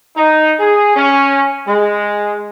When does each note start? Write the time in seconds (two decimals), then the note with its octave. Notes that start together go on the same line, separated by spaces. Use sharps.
0.17 D#4
0.60 G#4
0.96 C#4
1.67 G#3